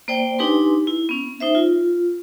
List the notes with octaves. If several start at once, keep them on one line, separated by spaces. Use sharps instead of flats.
A#3 C5 D5 G5
D4 D#4 G4 B4 G#5 C6
E4
B3 C#4
D#4 C5 E5
F4